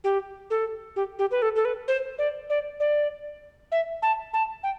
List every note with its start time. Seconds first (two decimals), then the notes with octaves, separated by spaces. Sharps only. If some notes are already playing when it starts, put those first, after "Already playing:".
0.04 G4
0.50 A4
0.96 G4
1.19 G4
1.31 B4
1.42 A4
1.56 A4
1.65 B4
1.88 C5
2.18 D5
2.50 D5
2.80 D5
3.72 E5
4.02 A5
4.33 A5
4.63 G5